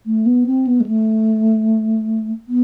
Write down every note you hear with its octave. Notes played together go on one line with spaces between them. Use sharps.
A3
B3
C4
B3
G#3
A3
B3